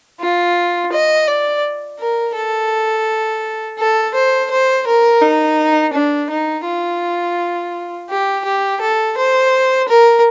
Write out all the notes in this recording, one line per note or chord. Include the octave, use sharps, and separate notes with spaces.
F4
D#5
D5
A#4
A4
A4
C5
C5
A#4
D#4
D4
D#4
F4
G4
G4
A4
C5
A#4